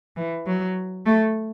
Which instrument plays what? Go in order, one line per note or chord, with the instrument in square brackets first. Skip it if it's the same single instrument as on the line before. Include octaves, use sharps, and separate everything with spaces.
[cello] E3
F#3
A3